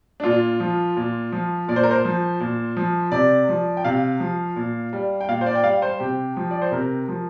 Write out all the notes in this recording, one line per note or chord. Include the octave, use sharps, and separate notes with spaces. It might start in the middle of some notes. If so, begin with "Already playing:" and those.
D4
A#2 F4
F3
A#2
F3
A#2 D5
C5
A#4
C5
F3
A#2
F3
C3 D5
F3
G5
C3 F5
F3
A#2
G3
G5
A#2 F5
C5
D5
G5
G3 F5
C5
C3 G4
F3
D5
C5
C3 A#4
F3